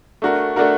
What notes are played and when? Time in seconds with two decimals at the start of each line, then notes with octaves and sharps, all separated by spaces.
0.22 A3 D4 F#4 A#4
0.56 A3 D4 F#4 A#4